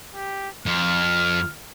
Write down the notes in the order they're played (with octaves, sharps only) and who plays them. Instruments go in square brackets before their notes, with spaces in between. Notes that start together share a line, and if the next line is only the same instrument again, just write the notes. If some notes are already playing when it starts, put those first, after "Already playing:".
[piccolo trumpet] G4
[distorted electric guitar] F2 [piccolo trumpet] F6